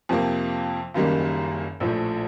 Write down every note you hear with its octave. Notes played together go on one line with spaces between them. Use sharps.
F2 C3 F3 A#3
F#1 F#2 D#3 G3 A#3
A#1 A2 F3 A3